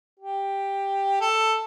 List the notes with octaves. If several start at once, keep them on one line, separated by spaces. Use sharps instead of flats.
G4
A4